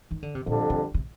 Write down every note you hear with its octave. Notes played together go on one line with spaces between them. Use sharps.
D#3
D3
C3
F2 A#2 D3 G3 D4
C3
C3